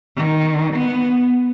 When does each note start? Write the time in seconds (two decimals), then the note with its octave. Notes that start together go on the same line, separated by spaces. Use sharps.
0.15 D#3
0.73 B3